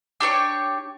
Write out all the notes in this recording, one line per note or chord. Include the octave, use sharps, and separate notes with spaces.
D4 G4 A4 C#5